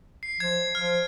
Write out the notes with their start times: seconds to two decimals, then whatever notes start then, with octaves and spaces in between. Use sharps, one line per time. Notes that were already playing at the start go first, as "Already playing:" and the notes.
0.23 C7
0.40 F3 G#6
0.75 F3 F6